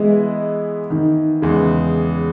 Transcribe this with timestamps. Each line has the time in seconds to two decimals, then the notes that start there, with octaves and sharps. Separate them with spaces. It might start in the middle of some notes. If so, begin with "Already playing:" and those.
Already playing: E3 G#3 B3 E4
0.90 D#3
1.42 E2 C#3 G#3